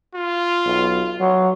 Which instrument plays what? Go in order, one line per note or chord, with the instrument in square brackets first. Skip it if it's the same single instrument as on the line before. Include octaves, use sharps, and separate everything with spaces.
[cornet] F4
[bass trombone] B1
F#3